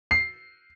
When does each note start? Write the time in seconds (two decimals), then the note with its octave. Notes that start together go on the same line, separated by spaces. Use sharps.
0.11 C7